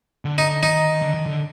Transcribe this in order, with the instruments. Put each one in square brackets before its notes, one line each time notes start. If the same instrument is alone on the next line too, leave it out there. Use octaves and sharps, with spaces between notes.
[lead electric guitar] D3
[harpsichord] D#4
[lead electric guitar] D#3 [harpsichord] D#4
[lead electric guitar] D3
D#3
D3